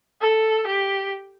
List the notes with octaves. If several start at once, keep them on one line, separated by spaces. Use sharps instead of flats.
A4
G4